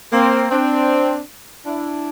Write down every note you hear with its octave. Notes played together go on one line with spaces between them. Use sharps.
A#3 C4
C4 D4
D4 E4